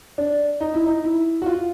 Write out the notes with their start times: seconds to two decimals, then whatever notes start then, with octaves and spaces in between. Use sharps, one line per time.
0.18 D4
0.60 D#4
0.74 E4
0.86 D#4
1.04 E4
1.42 F#4
1.46 F4